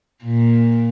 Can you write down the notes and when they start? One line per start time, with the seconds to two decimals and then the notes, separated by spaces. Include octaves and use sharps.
0.24 A#2